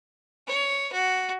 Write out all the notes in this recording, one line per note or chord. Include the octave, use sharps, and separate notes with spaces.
C#5
F#4